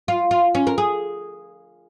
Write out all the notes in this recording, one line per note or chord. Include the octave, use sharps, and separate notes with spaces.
F4
F4
C#4
A#4
G#4